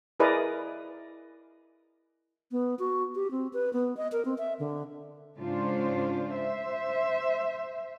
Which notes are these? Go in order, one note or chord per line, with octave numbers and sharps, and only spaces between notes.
E4 G#4 A#4 B4 D5 D#5
B3
F#4
G4
C4
B4
B3
D#5
A#4
C4
E5
D3
G#2 C#3 C#4 D4 F4 C5
C5 E5